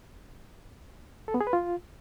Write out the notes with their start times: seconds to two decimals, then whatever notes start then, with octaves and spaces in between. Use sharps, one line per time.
1.28 A4
1.34 B3
1.41 G#4
1.47 B4
1.53 F4